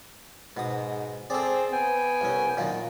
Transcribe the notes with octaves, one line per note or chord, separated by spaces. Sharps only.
G#2 B2 D#6
C4 G#4 A4 D5
B3 G5 G#5
C2 C#4
F#2 A#2 D#3 F4